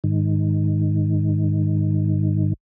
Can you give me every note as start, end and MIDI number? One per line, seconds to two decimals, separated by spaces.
0.04 2.53 44
0.04 2.53 51